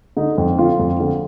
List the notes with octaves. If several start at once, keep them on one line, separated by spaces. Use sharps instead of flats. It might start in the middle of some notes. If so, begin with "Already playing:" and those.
D3 D#4
F2
D3 F4
F2
D3